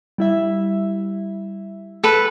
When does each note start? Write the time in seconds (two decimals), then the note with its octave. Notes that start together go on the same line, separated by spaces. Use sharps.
0.18 G3 E4 E5
2.04 A4 B4